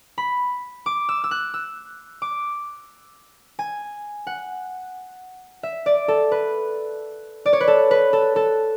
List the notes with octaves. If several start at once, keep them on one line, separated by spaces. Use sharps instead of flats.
B5
D6
E6
E6
F#6
E6
D6
G#5
F#5
E5
D5
A4
B4
D5
C#5
B4
A4
B4
A4
A4